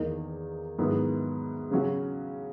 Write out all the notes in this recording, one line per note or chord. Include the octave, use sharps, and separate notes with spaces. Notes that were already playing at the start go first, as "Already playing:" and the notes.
Already playing: E2 D#3 A#3 D#4
G#2 D#3 F#3 B3 E4
C#3 F#3 C#4 F#4